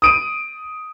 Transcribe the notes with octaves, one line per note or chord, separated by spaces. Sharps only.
D#6 D7 D#7